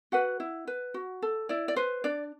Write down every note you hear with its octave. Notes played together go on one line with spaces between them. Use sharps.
F#4 B4 F#5
E4
B4
F#4
A4
E4 D5
D5
B4 C5
D4 D5